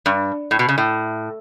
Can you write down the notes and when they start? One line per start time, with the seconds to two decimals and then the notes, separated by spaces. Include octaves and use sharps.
0.06 G2
0.51 A2
0.59 B2
0.69 C#3
0.78 A2